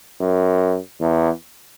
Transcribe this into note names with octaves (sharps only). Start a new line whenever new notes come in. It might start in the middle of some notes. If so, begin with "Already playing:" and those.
F#2
E2